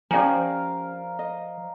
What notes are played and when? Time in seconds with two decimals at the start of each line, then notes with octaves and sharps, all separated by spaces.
0.11 F3 C#4 G4 A#4 D5 F5 G#5
1.19 D#5